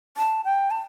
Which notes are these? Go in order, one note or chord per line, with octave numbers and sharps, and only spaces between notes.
A5
G5
A5